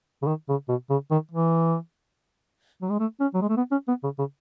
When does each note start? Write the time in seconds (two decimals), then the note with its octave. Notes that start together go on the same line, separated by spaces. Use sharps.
0.22 C#3
0.27 D#3
0.49 C#3
0.69 B2
0.90 C#3
1.11 D#3
1.31 E3
2.82 F#3
2.91 G#3
2.99 A3
3.20 C#4
3.34 F#3
3.42 G#3
3.49 A3
3.57 B3
3.71 C#4
3.88 B3
4.03 C#3
4.18 C#3